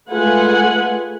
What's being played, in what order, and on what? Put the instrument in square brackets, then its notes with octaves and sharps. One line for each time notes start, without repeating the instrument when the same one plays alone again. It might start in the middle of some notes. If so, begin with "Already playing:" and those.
[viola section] G#3 A3 F4 B4 F#5 G#5